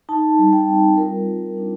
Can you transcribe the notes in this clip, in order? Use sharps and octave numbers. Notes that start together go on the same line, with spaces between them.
D#4 A5
G3
G5
C4
F4 A#4
G3
D4